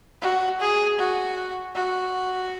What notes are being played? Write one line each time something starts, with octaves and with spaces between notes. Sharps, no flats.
F#4
G#4
F#4
F#4